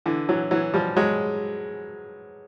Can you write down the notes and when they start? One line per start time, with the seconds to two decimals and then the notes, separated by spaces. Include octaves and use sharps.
0.06 D3 E3
0.29 E3 F#3
0.51 E3 F#3
0.74 F3 G3
0.96 F#3 G#3